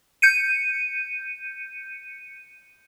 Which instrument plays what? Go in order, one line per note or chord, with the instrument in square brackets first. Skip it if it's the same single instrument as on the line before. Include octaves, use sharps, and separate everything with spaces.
[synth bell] G6 C#7 D#7